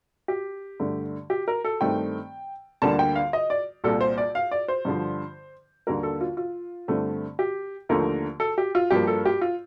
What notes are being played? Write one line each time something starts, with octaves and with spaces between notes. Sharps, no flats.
G4
G2 D3 A3
G4
A#4
A4
G2 D#3 A3 C4 G5
D2 D3 G3 A#3 A5
G5
F5
D#5
D5
C2 A#2 G3 A4
C5
D5
F5
D5
C5
G2 D3 F3
D#2 D3 G3 A#3 A#4
A4
F4
F4
G2 D3 A3 C4
G4
D#2 D3 F3 A3 A#4
A4
G4
F4
G2 F3 A#3 G4
A4
G4
F4